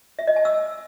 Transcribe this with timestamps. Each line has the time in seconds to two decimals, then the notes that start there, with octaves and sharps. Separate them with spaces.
0.19 E5
0.27 D#5
0.36 G#5
0.45 E6